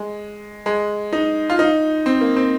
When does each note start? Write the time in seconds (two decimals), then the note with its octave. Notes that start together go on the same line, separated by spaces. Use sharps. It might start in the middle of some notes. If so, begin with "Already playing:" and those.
Already playing: G#3
0.66 G#3
1.13 D#4
1.50 F4
1.59 D#4
2.06 C4
2.21 A#3
2.36 C4